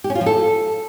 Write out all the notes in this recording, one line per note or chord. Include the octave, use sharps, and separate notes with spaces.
G4
C#4
F4
F3
A4